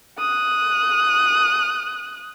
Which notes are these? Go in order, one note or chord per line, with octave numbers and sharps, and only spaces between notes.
D#6 F#6